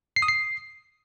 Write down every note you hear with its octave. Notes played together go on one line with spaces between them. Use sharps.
C7
D#6
C7